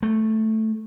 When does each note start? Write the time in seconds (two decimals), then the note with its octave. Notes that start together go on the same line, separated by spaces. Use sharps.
0.03 A3